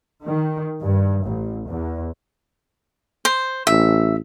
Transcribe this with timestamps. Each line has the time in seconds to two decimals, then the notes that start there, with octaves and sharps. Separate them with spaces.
0.23 D#3
0.80 G2
1.24 A1
1.66 E2
3.25 C5
3.67 A1 E5